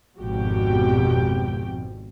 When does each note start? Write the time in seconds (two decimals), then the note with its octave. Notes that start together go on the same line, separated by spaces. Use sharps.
0.19 G#1 F2 B2 F#4 G4 G5